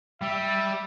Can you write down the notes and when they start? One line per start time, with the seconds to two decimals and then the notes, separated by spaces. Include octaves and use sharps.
0.21 G3 E5